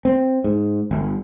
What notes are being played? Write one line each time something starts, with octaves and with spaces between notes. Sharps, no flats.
C4
G#2
G1